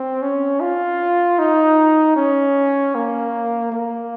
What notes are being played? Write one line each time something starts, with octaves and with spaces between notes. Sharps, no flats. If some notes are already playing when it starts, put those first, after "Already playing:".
Already playing: C4
C#4
F4
D#4
C#4
A#3
A#3